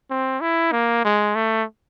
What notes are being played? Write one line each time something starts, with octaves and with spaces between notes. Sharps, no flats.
C4
E4
A#3
G#3
A3